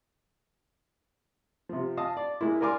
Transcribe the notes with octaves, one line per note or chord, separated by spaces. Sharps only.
C3 F3
D#5 F5 A5 D#6
D5
G#3 A#3 E4
A#4 D5 G#5 C6 D6 F6